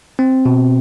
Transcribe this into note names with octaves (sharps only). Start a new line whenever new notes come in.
C4
B2